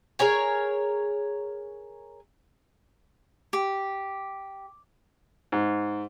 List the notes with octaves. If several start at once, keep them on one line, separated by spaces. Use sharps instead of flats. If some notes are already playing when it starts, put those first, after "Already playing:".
G#4 A#4 C#5 G#5
G4
G#2